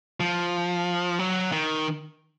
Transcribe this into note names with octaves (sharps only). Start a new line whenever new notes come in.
F3
F#3
D#3